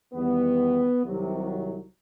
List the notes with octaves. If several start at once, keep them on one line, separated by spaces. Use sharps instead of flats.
E2 D#3 G3 B3
C2 C3 D#3 F#3